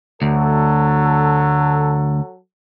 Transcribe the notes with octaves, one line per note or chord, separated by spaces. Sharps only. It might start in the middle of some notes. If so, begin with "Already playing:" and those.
D2 F#3 A4